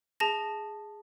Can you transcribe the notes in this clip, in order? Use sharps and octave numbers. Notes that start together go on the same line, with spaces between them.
G#4 A5 A#6